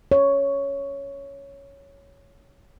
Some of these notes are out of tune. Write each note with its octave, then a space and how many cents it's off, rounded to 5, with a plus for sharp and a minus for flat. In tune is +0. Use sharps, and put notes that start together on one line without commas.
C#5 +5